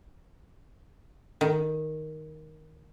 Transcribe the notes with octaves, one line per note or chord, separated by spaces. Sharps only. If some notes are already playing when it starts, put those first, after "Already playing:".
D#3